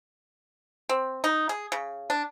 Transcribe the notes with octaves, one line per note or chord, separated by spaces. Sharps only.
C4
D#4
G#4
C#3
D4